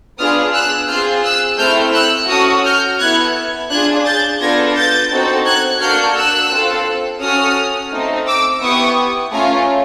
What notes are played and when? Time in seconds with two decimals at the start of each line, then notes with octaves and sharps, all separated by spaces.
0.18 B3 D4 F4 G#4 D#6 F6
0.54 E6 F#6
0.88 C4 F4 G#4 F6 G6
1.24 E6 F#6
1.58 A3 C4 E4 F6 G6
1.94 E6 F#6
2.29 C#4 F#4 A4 D#6 F6
2.65 F6 G6
2.99 B3 E4 A4 F#6 G#6
3.70 D4 F4 G#4 F#6 G#6
4.05 G6 A6
4.40 B3 D4 F4 A4 G#6 A#6
4.75 G6 A6
5.11 C4 D#4 F#4 A4
5.46 F#6 G#6
5.81 A#3 D4 F#4 A4 F6 G6
6.17 E6 F#6
6.51 C4 F4 A4
7.21 C#4 F#4 A4 D#6 F6
7.93 A3 C4 D#4
8.27 D6 E6
8.62 B3 E4 G4 C#6 D#6
9.32 A3 C#4 F4 G#5 A#5